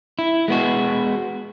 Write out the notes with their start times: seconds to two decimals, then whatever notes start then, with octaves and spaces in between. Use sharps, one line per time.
0.19 E4
0.48 G#3 B3 F#4